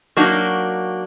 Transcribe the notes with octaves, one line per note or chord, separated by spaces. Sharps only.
F#3 A#3 D4 D#4 F#4